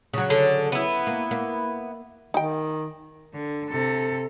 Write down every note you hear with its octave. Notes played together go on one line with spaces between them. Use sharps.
C#3 F#3
D3
B3 E4
A#3
A#3
D#3 D#4 G5
D3
C3 A4